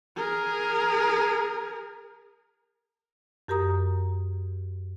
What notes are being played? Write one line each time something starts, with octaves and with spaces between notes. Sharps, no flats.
G#4 A#4
F#2 G4 A#4 A#5 D#6